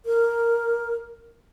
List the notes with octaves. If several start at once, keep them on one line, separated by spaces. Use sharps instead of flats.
A#4